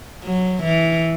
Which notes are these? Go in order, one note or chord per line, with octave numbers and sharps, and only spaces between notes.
F#3
E3